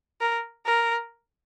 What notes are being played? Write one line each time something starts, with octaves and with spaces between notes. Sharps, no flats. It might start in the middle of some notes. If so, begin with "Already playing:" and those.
A#4
A#4